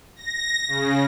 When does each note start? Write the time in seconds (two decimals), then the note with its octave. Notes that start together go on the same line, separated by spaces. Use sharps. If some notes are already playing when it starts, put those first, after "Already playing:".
0.16 A#6
0.68 C#3